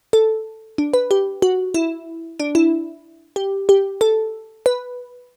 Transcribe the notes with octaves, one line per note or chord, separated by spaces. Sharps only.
A4
D4
B4
G4
F#4
E4
D4
E4
G4
G4
A4
B4